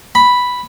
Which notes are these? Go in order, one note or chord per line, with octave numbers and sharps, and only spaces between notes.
B5